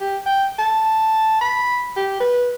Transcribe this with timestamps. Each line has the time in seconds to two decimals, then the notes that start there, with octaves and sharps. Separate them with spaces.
0.01 G4
0.26 G5
0.59 A5
1.41 B5
1.96 G4
2.20 B4